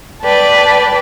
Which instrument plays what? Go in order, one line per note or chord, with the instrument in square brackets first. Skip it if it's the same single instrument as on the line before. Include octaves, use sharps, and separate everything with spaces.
[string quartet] B4 D5 G5 A5